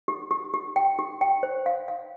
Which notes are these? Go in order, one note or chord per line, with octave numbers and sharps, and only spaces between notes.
G4
G4
G4
G5
G4
G5
C5
F5
F5